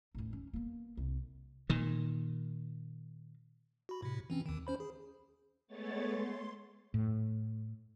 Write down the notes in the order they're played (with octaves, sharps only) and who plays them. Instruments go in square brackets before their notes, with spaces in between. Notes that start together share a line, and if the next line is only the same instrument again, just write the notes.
[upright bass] A1 D#2
C#4
A#3 B3
C2
[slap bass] A#2 D#3
[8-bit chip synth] F#4 B5
A2 C3
E3 C4 C#4
D#2 D#3
C#4 C5 B5
G#4
[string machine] G#3 A3 B3 C#5 A6
C6
[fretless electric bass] A2